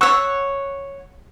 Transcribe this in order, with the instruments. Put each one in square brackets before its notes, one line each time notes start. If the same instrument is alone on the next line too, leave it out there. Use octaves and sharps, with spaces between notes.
[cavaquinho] C#5 F#5 [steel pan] C#6 E6